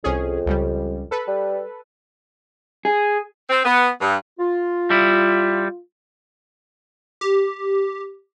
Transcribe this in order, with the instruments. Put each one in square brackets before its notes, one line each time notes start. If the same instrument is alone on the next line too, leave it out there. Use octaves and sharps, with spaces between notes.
[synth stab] C2 C#4 G#4 [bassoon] F2
[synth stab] C#2 C#3 G3
A4 B4
[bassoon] G3
[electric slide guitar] G#4
[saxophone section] C4
B3
G2
[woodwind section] F4
[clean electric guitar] G3 E4
[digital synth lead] G4